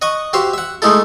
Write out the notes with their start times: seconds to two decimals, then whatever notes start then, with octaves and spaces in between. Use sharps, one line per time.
0.02 D#5 F#5 C#6 D#6
0.33 F#4 G4 C5 E5 F5
0.53 E5 F#5
0.82 G#3 A3 D#4 E4 A4